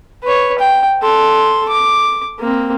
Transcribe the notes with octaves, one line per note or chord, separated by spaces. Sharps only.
B4 C#5
G5
A4 C6
D6
A#3 C4